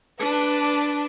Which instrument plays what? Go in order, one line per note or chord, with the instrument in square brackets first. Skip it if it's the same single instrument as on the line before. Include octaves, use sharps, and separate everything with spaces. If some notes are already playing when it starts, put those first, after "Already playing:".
[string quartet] D4 B4 A5